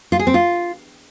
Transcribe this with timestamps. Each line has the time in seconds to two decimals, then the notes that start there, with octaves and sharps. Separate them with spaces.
0.12 F4
0.19 G#4
0.27 C4
0.34 F4